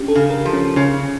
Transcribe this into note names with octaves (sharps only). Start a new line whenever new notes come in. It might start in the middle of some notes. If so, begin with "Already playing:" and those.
Already playing: C#4 D4 G4
A4
C#3
A#4
F3
C#4
C#3 C#4